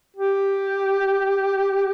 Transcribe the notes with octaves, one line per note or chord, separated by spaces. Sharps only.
G4